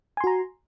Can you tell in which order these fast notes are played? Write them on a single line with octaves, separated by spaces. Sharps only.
G#5 C6 F#4 A#5